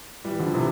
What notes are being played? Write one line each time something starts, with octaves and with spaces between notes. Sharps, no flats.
E3 G3
D3 F3
C3 E3